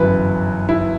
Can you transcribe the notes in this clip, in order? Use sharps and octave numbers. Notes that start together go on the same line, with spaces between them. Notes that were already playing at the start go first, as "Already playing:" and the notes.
Already playing: G1 F#2 E3 B4
E4